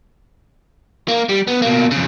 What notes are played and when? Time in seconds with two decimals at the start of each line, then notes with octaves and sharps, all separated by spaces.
1.08 A#3
1.29 G3
1.47 B3
1.62 B2 A#3
1.91 F2 C#3